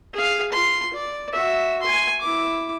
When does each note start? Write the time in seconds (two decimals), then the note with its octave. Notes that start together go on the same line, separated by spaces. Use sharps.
0.14 G#4 F5
0.52 F4 C6
0.94 D5
1.32 F#4 E5
1.82 G#5 C6
2.21 E4 D6